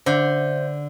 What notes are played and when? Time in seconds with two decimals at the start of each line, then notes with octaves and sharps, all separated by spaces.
0.06 D3 C5 E5 G6